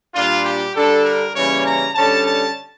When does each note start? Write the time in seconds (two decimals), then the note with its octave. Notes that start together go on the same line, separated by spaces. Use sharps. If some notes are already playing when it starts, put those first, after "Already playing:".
0.14 A#2 G3 D4 F4
0.44 G4
0.75 D3 G3 D4 A4
1.05 A#4
1.35 C#3 E3 G3 A#3 C#4 C#5
1.65 A#5
1.95 D3 G3 C#4 A5
2.26 A5